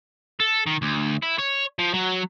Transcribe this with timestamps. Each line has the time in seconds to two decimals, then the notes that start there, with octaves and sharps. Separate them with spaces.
0.40 A4
0.66 D#3
0.82 D2
1.23 E4
1.39 C#5
1.79 F3
1.94 F#3